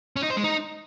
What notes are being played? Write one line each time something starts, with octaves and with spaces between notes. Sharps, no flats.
C#4
D#4
C5
G#3
D#4